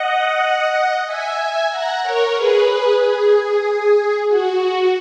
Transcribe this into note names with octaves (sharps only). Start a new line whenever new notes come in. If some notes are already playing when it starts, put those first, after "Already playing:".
Already playing: D#5 F#5
E5 G#5
F#5 A#5
A#4 C#5
G#4 B4
G#4
F#4